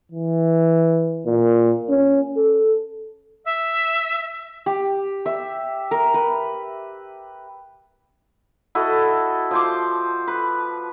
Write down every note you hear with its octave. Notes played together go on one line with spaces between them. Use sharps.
E3
A#2
C#4
A4
E5
G4
E5
A#4
B4
E4 F#4 A4 D#5
F3 C5 D6
B4